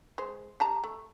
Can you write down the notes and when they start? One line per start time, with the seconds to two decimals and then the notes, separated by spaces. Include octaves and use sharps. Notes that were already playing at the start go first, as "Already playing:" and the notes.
0.18 G#3 C5
0.60 G3 A5 A#5
0.84 A3